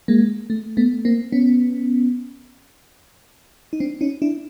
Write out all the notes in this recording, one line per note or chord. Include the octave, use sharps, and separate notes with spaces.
G#3 A#3
A3
A3 B3
A#3 C4
B3 C#4
D#4
C4 D4
C#4 D#4
D4 E4